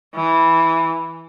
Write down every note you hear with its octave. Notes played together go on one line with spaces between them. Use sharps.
E3